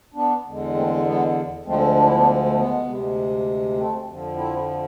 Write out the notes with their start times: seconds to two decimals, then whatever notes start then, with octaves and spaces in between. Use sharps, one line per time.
0.14 B3 D4
0.46 E2 D3 G#3
0.75 A3 C4
1.05 G#3 B3
1.65 D2 D3 F3 G#3 A3 C4
1.95 D4
2.06 E4
2.15 B3 D4
2.45 A3
2.55 G#3 B3
2.85 D2 C3 G#3
3.75 A3 C4
4.06 F2 D3 F3
4.36 C4 E4